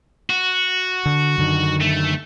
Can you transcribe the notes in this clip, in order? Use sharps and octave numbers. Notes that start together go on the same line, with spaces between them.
F#4
D3
F#2 D3 D#3
A3